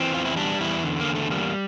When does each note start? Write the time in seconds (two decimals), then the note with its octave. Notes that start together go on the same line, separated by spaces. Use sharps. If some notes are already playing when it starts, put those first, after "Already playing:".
Already playing: E3 C4
0.12 E2 F4
0.25 E4
0.36 G3 D4
0.61 E2 E4
0.83 D3
1.00 A#3
1.08 E2
1.15 A3
1.31 G3 A#3